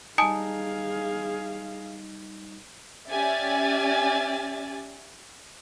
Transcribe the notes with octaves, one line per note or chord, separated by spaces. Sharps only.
G3 D#4 G#4 F5 G#5 A5 D#6
C#4 G4 D5 E5 G#5 A6